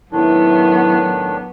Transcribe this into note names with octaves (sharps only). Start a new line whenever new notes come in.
A2 D#3 F#3 B3 D4 E4